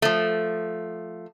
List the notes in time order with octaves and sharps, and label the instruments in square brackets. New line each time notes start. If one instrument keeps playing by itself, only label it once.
[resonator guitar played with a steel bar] F3 A3